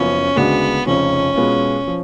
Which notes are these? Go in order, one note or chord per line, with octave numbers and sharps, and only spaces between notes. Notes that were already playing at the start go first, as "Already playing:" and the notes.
Already playing: F#1 F#2 F3 B3 C#4 F4
D2 C#3 G#3 B3 D4 F#4
F1 F2 C#3 F3 C#4
B2 G#3 B3 F4
F3